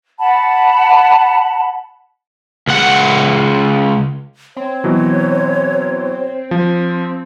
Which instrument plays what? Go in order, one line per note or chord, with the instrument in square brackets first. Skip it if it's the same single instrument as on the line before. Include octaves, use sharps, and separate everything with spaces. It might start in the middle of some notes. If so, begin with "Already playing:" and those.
[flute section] F#5 A5 B5
[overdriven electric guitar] C#2 F#5
[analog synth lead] C4 [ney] C#5
[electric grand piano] B2 E3 F#3
F3